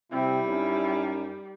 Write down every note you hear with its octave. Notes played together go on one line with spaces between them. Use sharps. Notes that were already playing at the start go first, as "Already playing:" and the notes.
C3 G3 C4 E4
F#2 C#4 D#4